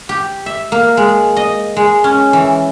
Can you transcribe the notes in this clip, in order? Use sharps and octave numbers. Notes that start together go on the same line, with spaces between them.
G4
E5
A#3
G#3
D#5
G#3
C#4
E3